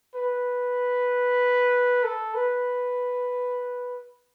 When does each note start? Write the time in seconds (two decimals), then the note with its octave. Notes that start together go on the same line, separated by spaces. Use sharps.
0.15 B4
2.04 A4
2.35 B4